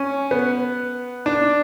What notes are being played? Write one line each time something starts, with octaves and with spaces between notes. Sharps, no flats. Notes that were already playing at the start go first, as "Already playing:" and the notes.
Already playing: C#4
B3
D4